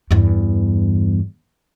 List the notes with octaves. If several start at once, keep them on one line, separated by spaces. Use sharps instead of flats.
E2 G2